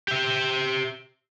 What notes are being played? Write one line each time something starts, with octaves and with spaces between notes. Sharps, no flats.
G4 E5